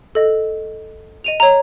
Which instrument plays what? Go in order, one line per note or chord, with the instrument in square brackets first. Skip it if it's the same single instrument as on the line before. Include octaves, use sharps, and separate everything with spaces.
[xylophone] A4 D#5
D#5 D#7 F7
C#5 A#5